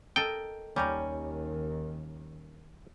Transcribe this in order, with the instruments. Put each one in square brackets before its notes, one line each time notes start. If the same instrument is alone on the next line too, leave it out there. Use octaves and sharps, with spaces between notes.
[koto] A4 A#4 D#5 [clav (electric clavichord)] G5
[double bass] D#2 D#3 [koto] G3 G4 A#4 [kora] C#4